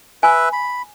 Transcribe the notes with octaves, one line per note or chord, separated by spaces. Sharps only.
B4 E5 G#5
B5